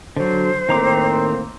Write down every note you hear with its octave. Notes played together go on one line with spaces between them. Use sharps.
D3 F#3 C5
A2 D#3 A#3 C4 A#5 D6